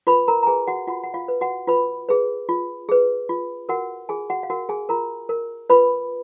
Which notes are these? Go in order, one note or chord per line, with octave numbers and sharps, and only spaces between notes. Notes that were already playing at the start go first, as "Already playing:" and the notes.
F4 B4 B5
A#4 A#5
A#5
G#4 B4 G#5
F#4 F#5
F4 F#4 F#5
F#5
F4 F5
B4
F#4 F#5
F4 B4 B5
G#4 B4
F4
G#4 B4
F4
F#4 A#4 F#5
F4 G#4 G#5
F#4 F#5
F5
F#4 A#4 F#5
G#4 G#5
F4 A#4 A#5
A#4
F4 B4 B5